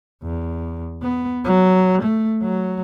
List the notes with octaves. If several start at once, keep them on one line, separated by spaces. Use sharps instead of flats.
E2
B3
F#3
A3
F#3